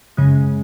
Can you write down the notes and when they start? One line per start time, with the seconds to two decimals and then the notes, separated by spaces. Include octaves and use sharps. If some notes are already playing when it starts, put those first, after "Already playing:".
0.17 F#2 C#3 G#3 C#4